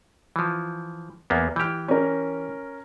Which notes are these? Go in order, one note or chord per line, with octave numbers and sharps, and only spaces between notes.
E3 F3
E2 A#3 B3
E3 G4 F6 G6
C#4 A#4